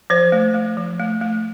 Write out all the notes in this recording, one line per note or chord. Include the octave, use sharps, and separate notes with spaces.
F3 C5
A3
A3
F3
A3
A3